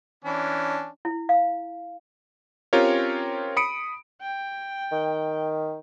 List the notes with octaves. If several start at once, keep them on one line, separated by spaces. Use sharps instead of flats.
E3 C#4 D4
E4
F5
C4 C#4 F4 G4 A#4 C#5
B5 D#6 C#7 D7
G5
D#3